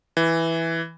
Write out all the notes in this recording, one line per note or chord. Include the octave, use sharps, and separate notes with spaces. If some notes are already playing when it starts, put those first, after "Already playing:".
E3